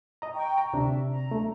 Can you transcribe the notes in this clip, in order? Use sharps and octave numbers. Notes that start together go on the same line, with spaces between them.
D#5 A#5
G5 C#6
A#5
D2 C3 D4 E5
A#5
A3